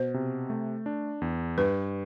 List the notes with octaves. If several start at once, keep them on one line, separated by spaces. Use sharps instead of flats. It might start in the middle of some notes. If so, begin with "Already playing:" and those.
Already playing: B2 C5
C3
A3
D4
E2
G2 B4